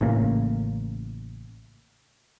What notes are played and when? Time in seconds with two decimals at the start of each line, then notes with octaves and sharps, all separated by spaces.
0.01 A1 A2 C#3 A#3